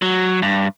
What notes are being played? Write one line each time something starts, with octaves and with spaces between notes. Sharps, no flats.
F#3
G2